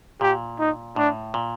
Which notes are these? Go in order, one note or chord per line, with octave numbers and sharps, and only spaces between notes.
A#2 G4
D#4
A2 D4
A#2